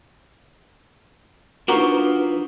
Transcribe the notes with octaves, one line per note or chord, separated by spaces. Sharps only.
F3 D4 D#4 F#4 A#4 B4